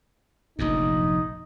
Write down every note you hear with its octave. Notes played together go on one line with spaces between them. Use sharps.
F1 A#1 F#2 D#4